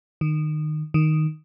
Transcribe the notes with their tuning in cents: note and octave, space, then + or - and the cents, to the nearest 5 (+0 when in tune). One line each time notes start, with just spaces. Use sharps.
D#3 -25
D#3 -5